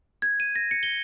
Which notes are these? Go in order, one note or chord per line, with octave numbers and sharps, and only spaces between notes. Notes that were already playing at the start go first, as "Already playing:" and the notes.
G#6
D#7
A#6
C#7
G7